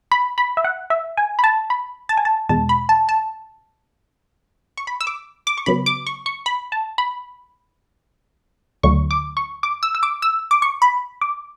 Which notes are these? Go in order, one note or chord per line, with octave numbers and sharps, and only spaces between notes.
B5
B5
E5
F#5
E5
G#5
B5
A5
B5
A5
G#5
A5
E2 B2 G#3 A5
B5
A5
A5
C#6
B5
E6
D6
D6
C#6
C#3 F#3 B3 B5
D6
C#6
C#6
B5
A5
B5
D2 D3 F#3 A3 C#6
D6
C#6
D6
E6
E6
D6
E6
D6
C#6
B5
D6